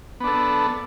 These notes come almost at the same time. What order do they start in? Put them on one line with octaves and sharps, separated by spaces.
B3 D4 A4